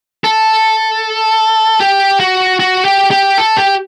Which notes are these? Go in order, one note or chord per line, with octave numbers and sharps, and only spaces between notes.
A4
G4
F#4
F#4
G4
G4
A4
G4